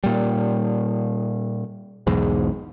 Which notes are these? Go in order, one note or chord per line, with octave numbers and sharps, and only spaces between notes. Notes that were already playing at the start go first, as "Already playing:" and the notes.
A#2 G3
B1 E2 G#2